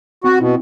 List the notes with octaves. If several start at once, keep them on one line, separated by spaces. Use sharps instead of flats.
C4 F#4
B2 E4